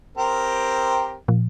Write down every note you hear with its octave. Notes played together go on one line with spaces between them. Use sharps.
C4 G4 A#4
A#2 F3